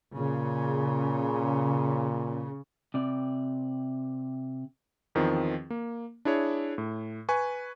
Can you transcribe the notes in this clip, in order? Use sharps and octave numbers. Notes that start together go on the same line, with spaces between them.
A#2 C#3
C3 D5
E2 D#3 F3 C4
A#3
D4 E4 G#4 C#5
A2
B4 G#5 C#6